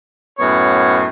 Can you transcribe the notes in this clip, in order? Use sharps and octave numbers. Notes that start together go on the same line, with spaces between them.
F#2 A2 B3 C#5